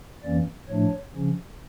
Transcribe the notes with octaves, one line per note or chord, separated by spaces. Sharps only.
F2 E3 A#3 C#4 D5
A2 F3 A3 D4 C#5
C#3 F3 C#4